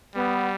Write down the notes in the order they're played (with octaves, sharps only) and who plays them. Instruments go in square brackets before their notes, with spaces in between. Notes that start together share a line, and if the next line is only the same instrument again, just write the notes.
[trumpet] G3 [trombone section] B3